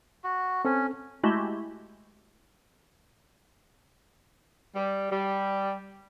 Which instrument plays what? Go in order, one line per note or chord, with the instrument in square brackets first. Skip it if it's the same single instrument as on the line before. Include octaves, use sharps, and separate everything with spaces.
[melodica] F#4
[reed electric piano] C4 A4 [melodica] C#4
[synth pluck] G#3 A3 E4 F#4 G4
[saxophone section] G3
G3